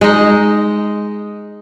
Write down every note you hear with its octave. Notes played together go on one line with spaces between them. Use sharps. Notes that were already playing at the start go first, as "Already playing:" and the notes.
G#3 D#4